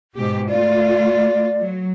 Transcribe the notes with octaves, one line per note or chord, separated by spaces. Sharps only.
G#2 B2 G4
A3 F4 D5
F#3